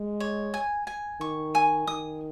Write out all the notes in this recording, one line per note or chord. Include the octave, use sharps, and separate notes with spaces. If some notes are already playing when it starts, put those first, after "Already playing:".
Already playing: G#3
C#5
G#5
G#5
D#3 C#6
G#5
D#3 D#6